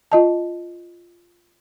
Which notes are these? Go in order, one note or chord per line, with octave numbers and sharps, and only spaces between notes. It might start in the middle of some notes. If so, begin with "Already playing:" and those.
F4 D#5 A5